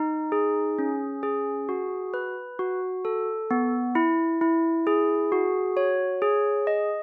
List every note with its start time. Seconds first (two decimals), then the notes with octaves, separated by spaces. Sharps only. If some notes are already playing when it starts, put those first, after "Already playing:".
Already playing: D#4
0.32 G#4
0.79 C#4
1.23 G#4
1.69 F#4
2.14 B4
2.59 F#4
3.05 A4
3.51 B3
3.95 E4
4.41 E4
4.87 G#4
5.32 F#4
5.77 C#5
6.22 G#4
6.67 D#5